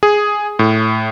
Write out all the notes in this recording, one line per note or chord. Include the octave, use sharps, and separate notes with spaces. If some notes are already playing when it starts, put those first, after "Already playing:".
G#4
A2